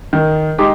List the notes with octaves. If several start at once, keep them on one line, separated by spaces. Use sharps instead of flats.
D#3
G#3 D#4 G4